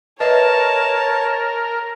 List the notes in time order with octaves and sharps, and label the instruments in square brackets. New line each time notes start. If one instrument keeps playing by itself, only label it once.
[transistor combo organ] A#4 [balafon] B4 D#5 E5 [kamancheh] C#5 [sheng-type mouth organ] A5